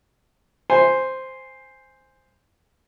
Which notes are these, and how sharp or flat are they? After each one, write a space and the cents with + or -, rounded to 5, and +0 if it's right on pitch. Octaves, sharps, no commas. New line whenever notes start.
C5 +0 G#5 -10